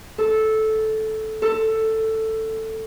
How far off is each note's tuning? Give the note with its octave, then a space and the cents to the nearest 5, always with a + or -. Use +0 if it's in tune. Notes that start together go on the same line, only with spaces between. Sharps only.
A4 -10
A4 +10